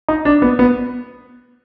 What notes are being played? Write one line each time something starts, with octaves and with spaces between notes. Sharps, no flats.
D#4
D4
B3
B3